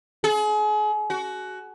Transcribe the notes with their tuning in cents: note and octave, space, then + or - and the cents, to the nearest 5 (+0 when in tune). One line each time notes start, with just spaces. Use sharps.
G#4 +35
F#4 +15